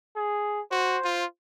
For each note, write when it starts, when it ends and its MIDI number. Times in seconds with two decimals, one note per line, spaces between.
0.16 0.61 68
0.72 0.98 66
0.72 1.24 72
1.04 1.25 65